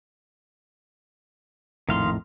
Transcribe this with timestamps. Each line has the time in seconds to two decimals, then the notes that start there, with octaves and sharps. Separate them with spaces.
1.89 A#1 F2 A2 D#3 F5 C6